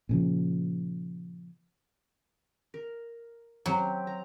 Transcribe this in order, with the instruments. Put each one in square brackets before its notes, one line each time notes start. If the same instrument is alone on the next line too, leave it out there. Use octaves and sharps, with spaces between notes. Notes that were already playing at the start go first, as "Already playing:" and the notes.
[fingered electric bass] A#2 C#3 F3
[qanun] A#4
[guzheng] F#3 [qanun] C4 G4
[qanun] A#5